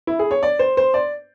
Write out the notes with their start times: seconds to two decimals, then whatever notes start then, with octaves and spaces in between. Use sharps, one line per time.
0.07 E4
0.19 G#4
0.31 C#5
0.43 D5
0.59 C5
0.77 C5
0.94 D5